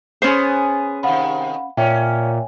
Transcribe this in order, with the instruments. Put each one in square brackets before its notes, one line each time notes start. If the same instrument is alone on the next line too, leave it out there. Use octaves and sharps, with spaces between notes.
[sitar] B3 G#4 [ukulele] C#4 C5
[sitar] C3 D#3 [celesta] F5 F#5 B5
[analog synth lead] A#2 [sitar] C#4 [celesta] C#5 E5 G5